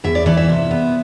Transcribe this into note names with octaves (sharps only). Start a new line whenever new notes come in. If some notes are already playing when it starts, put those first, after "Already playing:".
E2 E5
D5
E3 D5
E5
C3
B3